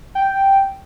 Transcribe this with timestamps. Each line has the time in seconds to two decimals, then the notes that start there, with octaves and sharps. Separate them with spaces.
0.15 G5